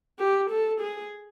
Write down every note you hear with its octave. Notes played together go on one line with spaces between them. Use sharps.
G4
A4
G#4